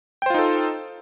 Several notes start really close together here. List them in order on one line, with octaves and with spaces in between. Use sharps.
G5 C5 F4 D#4 A4